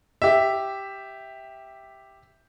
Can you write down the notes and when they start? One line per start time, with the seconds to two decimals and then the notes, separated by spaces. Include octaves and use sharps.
0.22 G4 E5